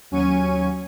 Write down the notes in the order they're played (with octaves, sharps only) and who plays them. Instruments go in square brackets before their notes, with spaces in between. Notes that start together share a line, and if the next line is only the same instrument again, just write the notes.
[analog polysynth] D#2 F#3 C#4 G#5 C#6 D#7